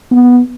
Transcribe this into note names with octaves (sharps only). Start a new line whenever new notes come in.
B3